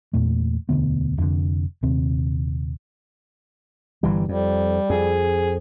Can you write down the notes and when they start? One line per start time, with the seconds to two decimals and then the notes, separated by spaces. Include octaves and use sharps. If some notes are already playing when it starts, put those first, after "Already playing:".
0.13 E2 A#2 A3
0.69 E1 D2 D3 B3
1.18 F1 F2 G#2 D3
1.83 D#1 D#2 C3 C4
4.03 G1 E3 G3
4.29 F2 G3
4.90 F2 G#4